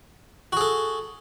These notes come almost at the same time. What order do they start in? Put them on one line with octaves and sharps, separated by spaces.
F#4 G#4 A4